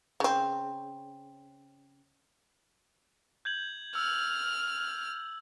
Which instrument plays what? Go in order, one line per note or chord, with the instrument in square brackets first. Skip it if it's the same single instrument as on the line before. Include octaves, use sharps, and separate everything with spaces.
[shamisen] C#3 C4
[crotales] G6 G#6 F#7
[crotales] E6 [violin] F6